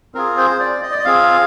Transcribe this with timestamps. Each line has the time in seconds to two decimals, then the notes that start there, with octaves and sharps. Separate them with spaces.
0.15 C4 F4 G#4 A#4
0.37 C5
0.60 D5
0.83 D#5
0.91 D5
0.99 D#5
1.05 C4 F4 G#4 F5